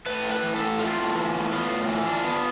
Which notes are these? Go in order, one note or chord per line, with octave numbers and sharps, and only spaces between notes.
A3 B4
A2
B4
E3
A4
A2
A3 F4
A2
E3
A2
B3 F4
A2
E3
D4
B3